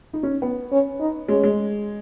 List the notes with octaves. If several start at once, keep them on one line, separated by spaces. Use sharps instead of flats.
D#4
C#4
B3
C#4
D#4
G#3 C#4
G#3